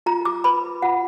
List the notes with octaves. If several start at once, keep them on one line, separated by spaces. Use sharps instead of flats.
F4 A#5
D6
B4 B5
F4 F#5